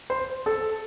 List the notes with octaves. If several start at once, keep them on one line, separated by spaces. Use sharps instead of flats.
C5
A4